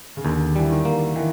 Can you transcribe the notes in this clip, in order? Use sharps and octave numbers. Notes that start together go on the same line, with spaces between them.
C#3
D#2 D3
E3 G3
D#3
A#3
D#3 E3